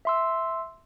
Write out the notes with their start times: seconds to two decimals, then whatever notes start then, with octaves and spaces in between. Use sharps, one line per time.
0.05 E5 C6 E6